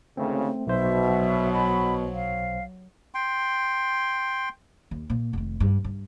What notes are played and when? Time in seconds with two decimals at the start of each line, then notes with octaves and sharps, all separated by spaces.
0.17 G#1 D2 C#3 A3 C4
0.67 B1 B2 C5 E5
1.08 F#3
1.53 B5
2.14 F5
3.14 G5 C6
4.91 D#2
5.10 A#2
5.33 F1 D#3
5.60 G2
5.84 G2